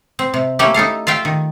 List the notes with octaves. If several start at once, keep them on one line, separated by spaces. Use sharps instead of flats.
C4
C3
A3 A#3 C#4 E4 G4
D#4 E4 A4 F5
F4 E5 F5 G5
D#3